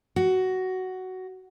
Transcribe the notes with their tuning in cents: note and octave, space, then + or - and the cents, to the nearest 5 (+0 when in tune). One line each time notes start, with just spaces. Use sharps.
F#4 +10